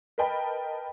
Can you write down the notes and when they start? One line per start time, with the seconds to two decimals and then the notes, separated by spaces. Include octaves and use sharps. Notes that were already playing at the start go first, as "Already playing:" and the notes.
0.18 A#4 B4 D#5 G5 A5 B5